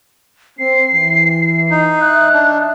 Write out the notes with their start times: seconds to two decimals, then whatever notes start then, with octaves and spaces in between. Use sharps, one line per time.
0.59 C4 C7
0.92 E3
1.70 D#4
2.01 D#5 E5 F#6
2.34 D4